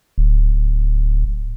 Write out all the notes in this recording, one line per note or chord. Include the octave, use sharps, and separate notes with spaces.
D1